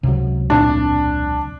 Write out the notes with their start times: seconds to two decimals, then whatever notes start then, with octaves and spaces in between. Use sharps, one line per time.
0.03 C#2 C3 F#3
0.50 E1 A#2 C4 D4